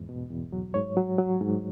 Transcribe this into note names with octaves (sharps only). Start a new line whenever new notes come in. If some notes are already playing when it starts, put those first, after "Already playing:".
Already playing: E2 G#2
B2
E2
F#3
G#2 C#5
F#3
F#3
G#2